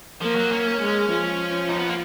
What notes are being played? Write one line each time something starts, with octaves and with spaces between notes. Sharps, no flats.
F3 A#3
F#3
C#4
G#3
F3
D#4
B3
A#3